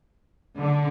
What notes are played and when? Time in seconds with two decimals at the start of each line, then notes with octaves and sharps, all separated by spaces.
0.60 D3